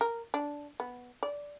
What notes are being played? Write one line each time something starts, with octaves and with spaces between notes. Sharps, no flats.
A#4
D4
B3
D5